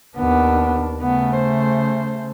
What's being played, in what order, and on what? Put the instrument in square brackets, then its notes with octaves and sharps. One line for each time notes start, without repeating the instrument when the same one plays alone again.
[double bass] D#2 D4 [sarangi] B3
[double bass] C#3 A3 [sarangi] B3
[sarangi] C5